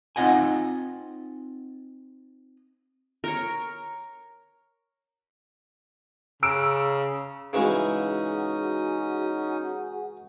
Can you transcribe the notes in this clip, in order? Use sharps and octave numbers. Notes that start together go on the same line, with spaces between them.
C4 D#4 F4 D#5 F#5 G#5
A#4 C#5
C#3 A#5 E6 D7
C#3 E3 G#3 C#4 D#4 F#4 G#4 D#6